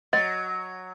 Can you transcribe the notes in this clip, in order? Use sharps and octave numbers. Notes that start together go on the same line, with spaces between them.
F#3 D#5